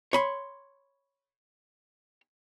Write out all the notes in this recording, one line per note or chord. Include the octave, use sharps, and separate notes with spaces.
C#5 B5 C6